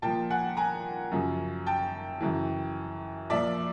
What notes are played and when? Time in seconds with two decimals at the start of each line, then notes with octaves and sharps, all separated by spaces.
0.02 A#2 F3 G5 A5
0.30 F#5 G#5
0.57 G#5 A#5
1.12 F#2 C#3 F3
1.67 G5 A5
2.20 F#2 C#3 E3
3.30 A#2 F3 D5 E5